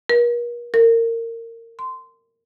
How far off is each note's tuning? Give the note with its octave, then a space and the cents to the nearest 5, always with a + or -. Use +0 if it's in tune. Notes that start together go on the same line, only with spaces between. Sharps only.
A#4 +40
A#4 -25
C6 -15